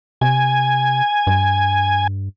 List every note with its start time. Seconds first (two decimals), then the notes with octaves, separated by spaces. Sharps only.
0.21 C3 G#5
1.27 G2